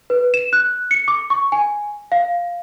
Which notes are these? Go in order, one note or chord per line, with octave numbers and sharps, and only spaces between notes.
B4
E7
F#6
C#7
D6
C#6
G#5
F5